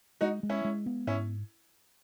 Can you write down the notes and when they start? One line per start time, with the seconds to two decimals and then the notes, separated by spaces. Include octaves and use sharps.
0.21 G#3 D#4 F#4
0.43 G#3
0.49 C#4 E4
0.65 G#3
0.86 B3
1.07 G#2 C#4 E4